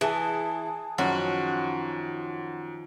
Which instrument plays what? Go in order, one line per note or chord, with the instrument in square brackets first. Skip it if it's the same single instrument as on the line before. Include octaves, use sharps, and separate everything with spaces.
[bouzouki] E3 [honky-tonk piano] G#4 A5
[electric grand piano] F#2 [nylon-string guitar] D#3 F3 C#4 [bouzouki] F#4